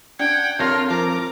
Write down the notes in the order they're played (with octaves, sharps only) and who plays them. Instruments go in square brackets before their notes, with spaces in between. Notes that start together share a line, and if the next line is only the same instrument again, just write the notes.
[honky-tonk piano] D4 [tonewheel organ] F#5 [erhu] G5 [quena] G#6
[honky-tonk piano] F2 A5 A#6 [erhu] F4 [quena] A#4 [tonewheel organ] C#5
[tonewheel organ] F3 D6 [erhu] A#5